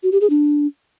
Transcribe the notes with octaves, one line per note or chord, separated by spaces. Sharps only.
F#4
G4
G#4
D4